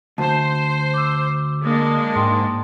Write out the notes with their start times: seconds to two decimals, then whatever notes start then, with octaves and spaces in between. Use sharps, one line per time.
0.18 D2 C5 A5
0.94 D6 E6
1.64 G#3 A#3 D4
2.16 G#2 G5 C6